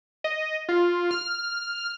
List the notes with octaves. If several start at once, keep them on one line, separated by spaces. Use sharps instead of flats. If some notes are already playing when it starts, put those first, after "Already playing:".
D#5
F4
F6